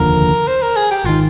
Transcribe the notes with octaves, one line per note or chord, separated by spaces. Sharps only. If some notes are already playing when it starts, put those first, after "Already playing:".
Already playing: F1 D#2 D3 F3 A#4
C5
A#4
G#4
G4
G#1 D#3 F4